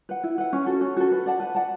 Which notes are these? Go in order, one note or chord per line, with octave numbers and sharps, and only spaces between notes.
B4 F#5
E4
B4 F#5
C#4
F#4 A4
C#4
F#4 A4
B4
D5 F#5 A5
B4
D5 F#5 A5